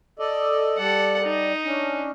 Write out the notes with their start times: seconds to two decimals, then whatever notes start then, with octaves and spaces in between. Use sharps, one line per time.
0.19 A4 D5 D#5
0.78 G3 A4 D5 F#5
1.24 D#4
1.65 C#4 D4